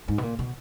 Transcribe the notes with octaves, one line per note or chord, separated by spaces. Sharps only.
G#2
B2
A#2
B2